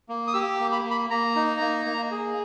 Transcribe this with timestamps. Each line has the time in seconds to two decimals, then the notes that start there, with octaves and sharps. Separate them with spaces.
0.09 A#3
0.27 D#6
0.33 G4 E6
0.60 A#3
0.72 B5
0.84 A#3
0.91 B5
1.10 A#3 A#5
1.35 D#4
1.61 A#3
1.86 A#3
2.11 G#4